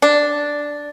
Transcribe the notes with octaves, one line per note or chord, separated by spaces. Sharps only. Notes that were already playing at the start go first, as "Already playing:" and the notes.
D4